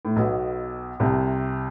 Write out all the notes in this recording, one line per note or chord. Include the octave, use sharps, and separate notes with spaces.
A2
B1 B2
C2 C3